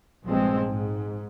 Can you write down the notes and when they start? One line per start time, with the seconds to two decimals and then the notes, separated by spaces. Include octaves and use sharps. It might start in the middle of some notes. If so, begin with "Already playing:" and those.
0.25 A#1 G2 F3 G#3 C4
0.64 G#2